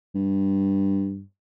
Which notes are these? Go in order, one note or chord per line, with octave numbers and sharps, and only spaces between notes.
G2